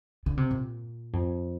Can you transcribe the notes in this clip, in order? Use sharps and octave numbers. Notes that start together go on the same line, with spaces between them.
D3
C3
A#2
F2